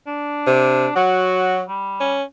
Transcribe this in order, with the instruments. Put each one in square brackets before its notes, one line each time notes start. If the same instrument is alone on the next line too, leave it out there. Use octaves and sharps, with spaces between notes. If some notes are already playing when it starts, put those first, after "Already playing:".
[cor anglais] D4
[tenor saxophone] C3
[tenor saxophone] F#3 [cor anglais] F#4
[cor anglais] G3
[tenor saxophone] C#4